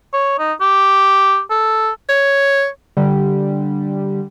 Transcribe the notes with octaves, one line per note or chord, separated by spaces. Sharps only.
C#5
D#4
G4
A4
C#5
D3 G3